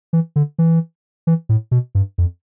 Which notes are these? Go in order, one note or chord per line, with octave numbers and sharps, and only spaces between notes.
E3
D3
E3
E3
A2
B2
G2
F2